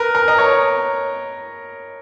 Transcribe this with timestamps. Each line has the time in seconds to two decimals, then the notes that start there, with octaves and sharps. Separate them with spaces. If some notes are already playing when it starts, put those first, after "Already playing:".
Already playing: A#4 B4
0.15 A#4
0.28 D#5
0.38 A#4 C#5